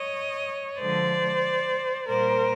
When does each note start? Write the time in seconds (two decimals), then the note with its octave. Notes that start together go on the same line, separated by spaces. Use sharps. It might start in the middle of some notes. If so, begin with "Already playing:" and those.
Already playing: C#5 D#5
0.80 D3 F3 G#3 C5 D5
2.10 A#2 G3 A#3 A#4 C5